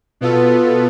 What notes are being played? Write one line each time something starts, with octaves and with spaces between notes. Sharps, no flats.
B2 B3 F4 A4